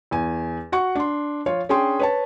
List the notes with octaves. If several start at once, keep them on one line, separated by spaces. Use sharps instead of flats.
E2 G#5
F#4 F#5 C#6
D4 C6
F3 F4 C#5
C#4 D4 G#4 G5 C6
B4 C#5 A5